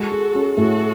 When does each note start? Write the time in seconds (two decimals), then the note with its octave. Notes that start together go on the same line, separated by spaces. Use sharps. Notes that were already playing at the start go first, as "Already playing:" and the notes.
Already playing: G#3 F#4 A4
0.12 G#4
0.35 C#4
0.57 A2 F#4 A4